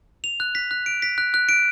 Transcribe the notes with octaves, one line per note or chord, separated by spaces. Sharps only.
F7
F#6
B6
F#6
D7
B6
F#6
F#6
D7